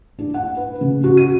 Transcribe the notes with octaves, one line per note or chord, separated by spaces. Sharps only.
D4
F#5
B4
C#3
F#4
D#7